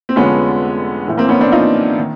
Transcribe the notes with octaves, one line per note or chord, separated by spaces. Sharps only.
C4
F1 F2 D3 F3 G#3 B3 C#4
A#1 A2 E3
A#3 C4
B3 C#4
C4 D4
D#4 F4
D#3